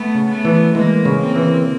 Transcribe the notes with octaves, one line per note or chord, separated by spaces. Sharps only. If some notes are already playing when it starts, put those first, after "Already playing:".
Already playing: A3 B3
C#3
A3 B3
E3
E3 G#3 A#3
C#3
A#3 C4
E3